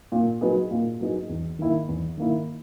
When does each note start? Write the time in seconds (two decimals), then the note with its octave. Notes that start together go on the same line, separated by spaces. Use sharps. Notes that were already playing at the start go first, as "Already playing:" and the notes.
0.12 A#2
0.41 F#3 B3 D#4 G#4
0.71 A#2
1.00 F#3 B3 D#4 G#4
1.29 E2
1.59 D#3 A#3 E4
1.88 E2
2.18 D#3 A#3 E4